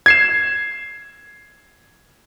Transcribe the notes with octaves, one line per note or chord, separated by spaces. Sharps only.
G#6 C7 E7